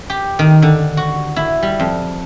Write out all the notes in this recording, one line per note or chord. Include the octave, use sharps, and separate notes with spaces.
G4
D#3
D3
F#4
E4
G3
F2